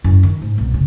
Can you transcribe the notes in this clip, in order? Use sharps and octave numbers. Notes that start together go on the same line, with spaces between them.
F#2 E4
D#3
G#2
C2 B2
F#2 C#3